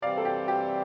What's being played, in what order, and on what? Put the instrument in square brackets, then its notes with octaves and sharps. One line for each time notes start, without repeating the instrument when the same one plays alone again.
[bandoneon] C3 E3 G3 C4 [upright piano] D5 F5
[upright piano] A4
G4
G4